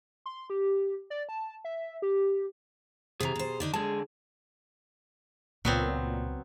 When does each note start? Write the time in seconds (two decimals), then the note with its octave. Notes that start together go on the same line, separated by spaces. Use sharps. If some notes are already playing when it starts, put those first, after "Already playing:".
0.26 C6
0.50 G4
1.10 D5
1.29 A5
1.65 E5
2.02 G4
3.20 C3 E3 G#4 A#5
3.35 B2 C5
3.60 D3 D4 D#4
3.74 D3 G#3 G#4 A5
5.65 C#2 A#2 F#3 B3 C4